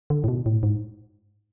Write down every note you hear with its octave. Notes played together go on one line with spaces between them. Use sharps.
D3
A2
B2
A2
G#2